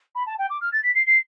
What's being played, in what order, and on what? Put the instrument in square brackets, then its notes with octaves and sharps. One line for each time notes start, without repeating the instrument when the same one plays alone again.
[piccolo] B5
A5
G5
D6
F6
A6
B6
C7
C7